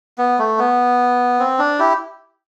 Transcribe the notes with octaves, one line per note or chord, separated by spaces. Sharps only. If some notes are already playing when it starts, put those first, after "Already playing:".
B3
A3
B3
C4
D4
E4 G4